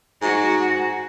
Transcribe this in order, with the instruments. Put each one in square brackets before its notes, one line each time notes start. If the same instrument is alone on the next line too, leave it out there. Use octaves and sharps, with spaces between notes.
[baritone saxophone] G#2 [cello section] F#4